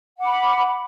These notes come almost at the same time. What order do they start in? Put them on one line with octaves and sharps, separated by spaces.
F#5 D6 B5